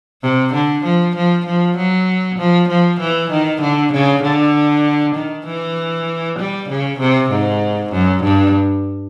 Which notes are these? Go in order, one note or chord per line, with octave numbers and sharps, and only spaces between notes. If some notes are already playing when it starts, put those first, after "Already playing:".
C3
D3
F3
F3
F3
F#3
F3
F3
E3
D#3
D3
C#3
D3
D#3
E3
G3
C#3
C3
G#2
F#2
G2